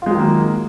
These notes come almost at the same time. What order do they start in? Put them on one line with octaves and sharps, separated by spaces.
F4 G#3 F#3 D#3 A#3